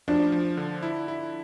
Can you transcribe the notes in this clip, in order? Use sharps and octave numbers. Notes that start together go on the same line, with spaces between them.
F3 D4
F3
D3
E4
E4